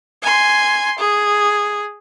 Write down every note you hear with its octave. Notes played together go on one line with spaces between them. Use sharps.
G#5 C6
G#4